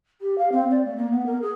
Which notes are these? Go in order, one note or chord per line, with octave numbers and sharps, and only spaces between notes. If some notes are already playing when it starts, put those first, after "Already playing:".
G4
F5
C4
D5
A3
A#3
B3
A#4
G#4